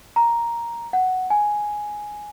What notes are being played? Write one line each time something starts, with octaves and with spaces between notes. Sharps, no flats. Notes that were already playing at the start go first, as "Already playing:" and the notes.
A#5
F#5
G#5